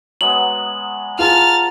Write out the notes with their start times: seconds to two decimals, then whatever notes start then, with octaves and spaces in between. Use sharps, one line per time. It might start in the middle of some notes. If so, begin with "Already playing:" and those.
0.21 F#3 G#3 B3 F#7
1.19 F4 G#4 B4 A5 A#5 F6 A6